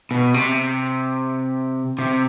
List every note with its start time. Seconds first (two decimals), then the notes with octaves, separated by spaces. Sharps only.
0.11 B2
0.34 C3
1.99 C3